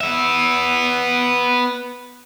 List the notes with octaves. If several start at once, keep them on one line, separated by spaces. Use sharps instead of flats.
B3 E5